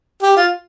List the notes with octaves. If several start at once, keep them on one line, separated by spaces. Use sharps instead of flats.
G4
F4